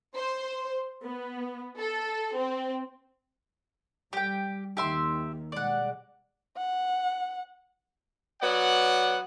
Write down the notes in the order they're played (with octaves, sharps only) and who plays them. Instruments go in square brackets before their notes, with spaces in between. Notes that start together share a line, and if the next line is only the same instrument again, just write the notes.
[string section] C5
B3
A4
C4
[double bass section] G3 [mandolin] G4 G5
[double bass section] D#2 D#3 [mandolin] G4 E5 C6
[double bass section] B2 G3 G#3 [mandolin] D5 F#5
[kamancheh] F#5
[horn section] F#3 B3 D5 F#5